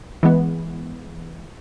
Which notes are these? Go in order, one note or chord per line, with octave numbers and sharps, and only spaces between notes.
E3 G#3 B3